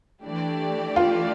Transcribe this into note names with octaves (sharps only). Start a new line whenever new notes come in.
E3 A3 D4 G4 D5
F4